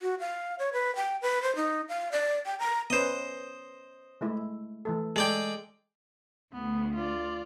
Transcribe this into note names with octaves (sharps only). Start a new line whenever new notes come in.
F#4
F5
C#5
B4
G5
B4
C5
D#4
F5
D5
G5
A#5
B3 C#4 B4 C5 D#5
G#3 A3 E4
E3 A3 A4
G#3 A4 D5 G5
D2 B3
F4 D5